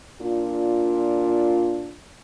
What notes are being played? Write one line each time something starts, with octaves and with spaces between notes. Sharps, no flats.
A#2 D4 F4